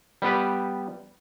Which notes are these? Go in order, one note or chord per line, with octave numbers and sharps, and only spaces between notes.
G3 B3 G4 B4